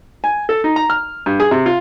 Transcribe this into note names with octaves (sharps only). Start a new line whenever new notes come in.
G#5
A4
D#4
A#5
F6
G2
G#4
C3
F4